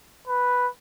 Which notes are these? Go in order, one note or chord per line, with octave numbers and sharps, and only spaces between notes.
B4